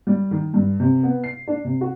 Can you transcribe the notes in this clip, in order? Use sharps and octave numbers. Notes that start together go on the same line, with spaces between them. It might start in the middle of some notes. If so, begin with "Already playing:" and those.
G3
D#3
G2
C3
B3
C7
D4
C3
F#4